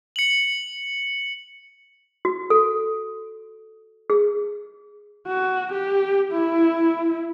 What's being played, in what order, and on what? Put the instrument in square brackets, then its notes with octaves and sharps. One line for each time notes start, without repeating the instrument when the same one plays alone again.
[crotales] C#7 F#7
[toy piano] F#4
A4
G#4
[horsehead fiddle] F#4
G4
E4